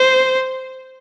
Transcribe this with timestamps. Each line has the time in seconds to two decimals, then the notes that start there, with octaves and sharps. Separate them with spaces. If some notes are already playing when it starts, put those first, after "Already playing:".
Already playing: C5